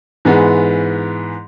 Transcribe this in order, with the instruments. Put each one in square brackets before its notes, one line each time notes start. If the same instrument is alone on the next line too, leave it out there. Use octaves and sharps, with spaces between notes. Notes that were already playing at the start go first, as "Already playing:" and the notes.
[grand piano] G#2 E3 G#3 B3